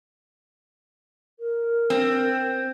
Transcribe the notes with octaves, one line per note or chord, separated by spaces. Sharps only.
A#4
C4